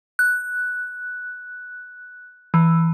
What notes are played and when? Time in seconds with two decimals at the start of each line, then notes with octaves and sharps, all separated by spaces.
0.19 F#6
2.54 E3